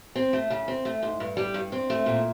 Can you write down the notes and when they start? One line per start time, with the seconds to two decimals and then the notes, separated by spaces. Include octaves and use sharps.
0.15 C4
0.33 A3
0.50 C#3
0.68 C4
0.85 A3
1.03 G#2
1.20 G2
1.37 G3
1.54 G2
1.72 C4
1.90 A3
2.06 A#2